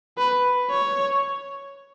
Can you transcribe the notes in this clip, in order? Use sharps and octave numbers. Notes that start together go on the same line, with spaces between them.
B4
C#5